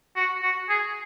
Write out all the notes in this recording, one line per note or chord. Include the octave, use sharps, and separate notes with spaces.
F#4
F#4
G#4